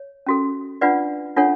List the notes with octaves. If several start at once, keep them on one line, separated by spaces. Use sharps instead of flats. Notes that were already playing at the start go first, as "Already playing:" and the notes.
Already playing: C#5
C#4 F#4 A4
D4 F4 B4 D5 F#5
D4 F4 A4 C#5 F#5